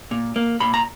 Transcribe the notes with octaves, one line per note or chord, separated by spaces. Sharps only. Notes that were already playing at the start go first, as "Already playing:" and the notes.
A#2
A#3
A#2 B5
A#5